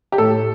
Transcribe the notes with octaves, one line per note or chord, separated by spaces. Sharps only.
G4
A2 A4